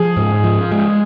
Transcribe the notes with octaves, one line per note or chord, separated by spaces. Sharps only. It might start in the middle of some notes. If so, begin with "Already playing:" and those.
Already playing: F3 G#4
G#2
F3
G#3